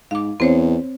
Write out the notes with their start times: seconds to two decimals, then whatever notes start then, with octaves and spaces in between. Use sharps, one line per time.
0.11 G#2 F5 D6
0.40 E2 C4 C5 C#5